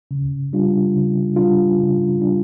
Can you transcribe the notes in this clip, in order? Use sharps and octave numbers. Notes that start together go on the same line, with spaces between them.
C#3
G3 D4 F4
C#3
G3 D4 F4
C#3
G3 D4 F4